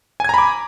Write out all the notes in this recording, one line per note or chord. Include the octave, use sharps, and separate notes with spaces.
G#5 A#5 B5 D6 G#6